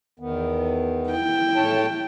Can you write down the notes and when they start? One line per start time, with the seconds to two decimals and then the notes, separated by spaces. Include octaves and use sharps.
0.20 E2 D#3 B3
1.10 E4 G5
1.56 A2 C#5 A5